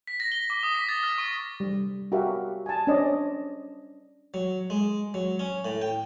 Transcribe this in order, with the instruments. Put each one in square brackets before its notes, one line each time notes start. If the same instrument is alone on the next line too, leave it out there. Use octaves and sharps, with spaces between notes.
[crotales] B6
A#6
G7
D6
D#6
B6
A6
F6
C#6
[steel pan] G3
F#4 G4 A#4 E5 F5
G#5 A5
C#4 D4 C5 D5 D#5
[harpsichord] F#3
G#3
F#3
C#4
A2
G5